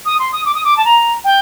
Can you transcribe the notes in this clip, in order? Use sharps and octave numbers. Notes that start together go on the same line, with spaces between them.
D#6
C6
D#6
D6
D#6
D6
A5
A#5
G5